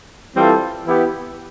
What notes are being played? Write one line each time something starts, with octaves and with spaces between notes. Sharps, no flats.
E3 G3 C4 F4 A4
E3 B3 E4 G4